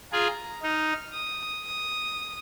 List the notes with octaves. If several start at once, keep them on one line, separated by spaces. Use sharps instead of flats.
F4 G#4 A#5
D#4 F6
D#6
D#6